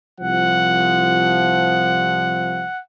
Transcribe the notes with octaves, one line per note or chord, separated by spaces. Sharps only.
C2 F3 F#5